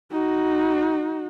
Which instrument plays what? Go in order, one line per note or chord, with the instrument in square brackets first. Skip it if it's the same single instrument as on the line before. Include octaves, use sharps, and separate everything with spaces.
[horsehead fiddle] D#4 F#4